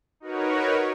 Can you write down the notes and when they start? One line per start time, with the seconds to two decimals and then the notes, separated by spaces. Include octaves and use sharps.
0.20 D#4 F#4 A#4 B4 C#5